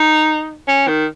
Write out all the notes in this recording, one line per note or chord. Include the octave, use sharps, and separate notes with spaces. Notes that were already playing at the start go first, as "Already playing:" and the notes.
Already playing: D#4
C#4
D#3